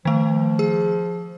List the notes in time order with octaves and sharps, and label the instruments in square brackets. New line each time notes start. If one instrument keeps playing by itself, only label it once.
[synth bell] D#3 A3 [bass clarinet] F3
[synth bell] G#4